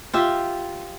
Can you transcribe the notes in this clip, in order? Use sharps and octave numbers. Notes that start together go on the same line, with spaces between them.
F4 G4 E5